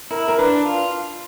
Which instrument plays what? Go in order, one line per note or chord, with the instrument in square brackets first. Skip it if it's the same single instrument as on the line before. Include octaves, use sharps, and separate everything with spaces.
[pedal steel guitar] E4 [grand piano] A#4
[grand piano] A#4
[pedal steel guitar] D4 [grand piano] B4
[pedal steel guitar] F4